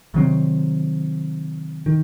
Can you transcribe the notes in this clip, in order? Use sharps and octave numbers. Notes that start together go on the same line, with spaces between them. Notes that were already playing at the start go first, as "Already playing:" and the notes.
C3 D#3 F#3 C4
D#3